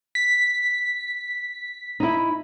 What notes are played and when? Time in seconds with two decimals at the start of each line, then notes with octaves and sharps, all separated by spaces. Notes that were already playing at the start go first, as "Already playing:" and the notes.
0.15 B6
2.00 D#4 E4